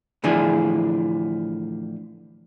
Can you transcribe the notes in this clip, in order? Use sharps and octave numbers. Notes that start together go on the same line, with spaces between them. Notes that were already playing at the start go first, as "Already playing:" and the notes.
A2 D3 E3 F3 D4 G#4